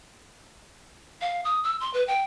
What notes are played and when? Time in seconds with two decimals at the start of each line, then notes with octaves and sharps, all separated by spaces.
1.21 F5
1.44 D#6
1.64 E6
1.80 C6
1.94 B4
2.07 G5